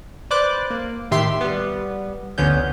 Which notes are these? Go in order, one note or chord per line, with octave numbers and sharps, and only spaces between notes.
B4 C5 D5 D6 F#6
A#3
A2 D#3 G4 E5 C6 C7
G3 B3
G1 D2 D3 B3 C#4 G6